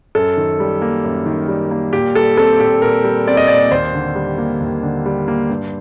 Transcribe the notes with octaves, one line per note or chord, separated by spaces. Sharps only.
F#2 A4
D#3
G3
A#3
F#2
D#3
G3
A#3
A#2 G4
G3 A4
C4 A4
A#2 G4
A#2 A#4
G3
C4 D5
D#5
A#2 D5
D#2 C5
D3
G3
A#3
D#2
D3
G3
A#3
G2